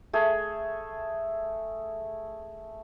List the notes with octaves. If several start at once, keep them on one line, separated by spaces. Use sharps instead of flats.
A3 G#4